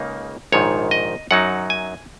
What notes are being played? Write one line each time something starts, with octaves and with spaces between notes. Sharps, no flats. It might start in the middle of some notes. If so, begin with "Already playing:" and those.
Already playing: C#2 C#3 A#3 D#4
A#1 G#2 D#3 C#5
D#5
F#2 F#3 D#4 F#5
G#5